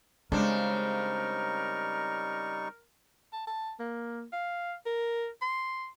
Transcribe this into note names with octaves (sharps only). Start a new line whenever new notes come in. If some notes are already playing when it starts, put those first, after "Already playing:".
C#3 G3 G#3 C4 D4 D#4 A#4 C#6
A5
A5
A#3
F5
A#4
C6